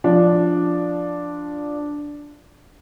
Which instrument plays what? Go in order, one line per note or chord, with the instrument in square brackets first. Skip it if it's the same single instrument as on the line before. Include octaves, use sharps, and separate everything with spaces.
[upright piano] F3 D4